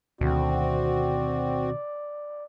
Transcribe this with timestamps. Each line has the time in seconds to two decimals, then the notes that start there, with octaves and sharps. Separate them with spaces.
0.21 D2 B2 D#3 C4 F#4 D5